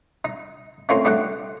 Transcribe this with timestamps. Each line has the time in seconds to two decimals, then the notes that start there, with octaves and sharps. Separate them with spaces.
0.25 D#4
0.89 A3 A#3 C4 C#4 D#4 F4
1.05 A3 D4 D#4 F#4 G4 F#5